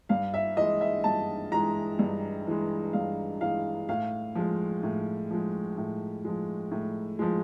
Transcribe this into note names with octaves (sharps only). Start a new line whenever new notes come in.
G2 F5
E5
E3 G#3 D#5
E5
G2 A5
E3 G#3 A#5
G2
E3 G#3
G2 F5
E3 G#3 F5
A2 F5
F3 G#3
A2
F3 G#3
A2
F3 G#3
A2
F3 G#3